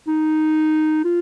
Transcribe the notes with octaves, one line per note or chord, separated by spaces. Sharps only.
D#4
F4